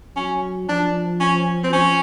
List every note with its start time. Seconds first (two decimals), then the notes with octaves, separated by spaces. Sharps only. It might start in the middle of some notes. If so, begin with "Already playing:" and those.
0.16 F#3 C#4
0.68 F3 D4
1.20 C#4
1.64 C4
1.72 F3 C#4